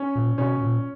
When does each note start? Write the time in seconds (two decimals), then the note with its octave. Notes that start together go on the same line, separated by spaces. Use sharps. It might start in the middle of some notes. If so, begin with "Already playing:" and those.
Already playing: C#4
0.15 A#2
0.38 B2 C#4
0.61 A#2